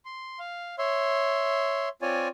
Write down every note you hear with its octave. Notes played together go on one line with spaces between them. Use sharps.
C6
F5
C#5 E5 C6
C4 F4 C#5 D5 G#5